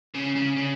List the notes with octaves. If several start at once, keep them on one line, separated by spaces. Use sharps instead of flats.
C#3
C#3
C#3